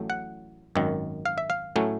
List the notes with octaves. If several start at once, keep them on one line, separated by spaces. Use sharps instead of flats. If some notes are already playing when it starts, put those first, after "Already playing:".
Already playing: A1 A2 F#3 A3
F#5
G#1 F#2 D#3
F5
E5
F5
A2 F#3 A3 C#4